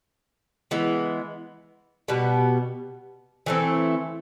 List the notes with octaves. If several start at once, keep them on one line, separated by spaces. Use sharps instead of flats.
E3 G#3 B3
B2 G3 B3
E3 A3 C4